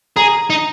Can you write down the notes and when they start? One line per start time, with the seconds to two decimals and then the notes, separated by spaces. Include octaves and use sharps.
0.16 G#4 A#5
0.50 D#4